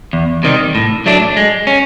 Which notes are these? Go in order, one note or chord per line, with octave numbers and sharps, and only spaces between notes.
E2
C3 D#3 G3
A2
F#3 A3 D4
G#3
C#4